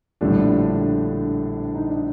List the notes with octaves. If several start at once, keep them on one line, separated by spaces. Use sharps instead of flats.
A#1 A2 D3 G3 D4
D#4
D4